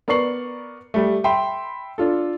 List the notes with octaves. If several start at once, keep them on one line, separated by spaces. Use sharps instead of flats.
B3 A#4 D5 C#6 C7 F#7
G3 A3
E5 G5 B5 C6
D4 F4 A4